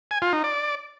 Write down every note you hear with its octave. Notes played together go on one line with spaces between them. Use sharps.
G#5
F4
D#4
D5